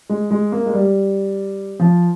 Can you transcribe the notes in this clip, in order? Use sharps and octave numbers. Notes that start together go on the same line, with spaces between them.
G#3
G#3
A#3
G#3
G3
F3